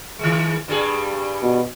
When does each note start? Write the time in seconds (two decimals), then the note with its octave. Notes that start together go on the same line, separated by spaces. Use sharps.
0.19 D#3 G#3
0.68 G2 G3 G#4
1.43 B2